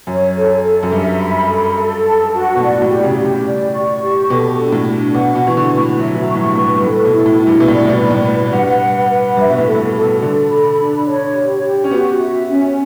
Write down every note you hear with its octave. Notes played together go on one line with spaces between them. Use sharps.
F#2 C#5
A4
A4
F#2
G2 E5
B5
A4
A4
A5
F#4
B2
A2 D5
A2
G4
C#3
G4
A2
D5
C#6
G4
B2 A4
D4
A2
D4
B2 F#5
B2
E3 C#6
D3
B4
A2
F#3 E5
E3
F#3
C#6
A2
G2
A2 B4
G2
G2
A2 A4
B2
E4
A2
E4
G2
B2
A2 D5
A2
B2
B4
A2
B4
G2 F#5
B4
B4
G2 E5
B2
A2
A4
B2
A4
B2
D3 A4
B5
D4
C#5
G4
G4
C#4
B3 F#4
E5
C#4